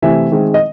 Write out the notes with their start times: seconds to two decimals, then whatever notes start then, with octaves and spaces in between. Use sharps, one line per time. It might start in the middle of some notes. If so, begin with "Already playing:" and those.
0.02 C3 E3 A3 C4 E5 G#5
0.32 D#3 G#3 C4
0.54 D#5